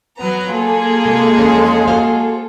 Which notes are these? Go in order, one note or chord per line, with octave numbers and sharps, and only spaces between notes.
F#3 B3 A#5
A#3 F4 G#4 A4
C3 G#3
F2 E3 C#4
F#4 C5 F5